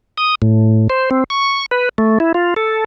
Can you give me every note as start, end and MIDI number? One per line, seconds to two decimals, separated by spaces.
0.18 0.35 87
0.42 0.88 45
0.90 1.10 72
1.11 1.24 60
1.30 1.66 85
1.71 1.89 71
1.98 2.18 57
2.20 2.32 64
2.34 2.54 65
2.56 2.84 69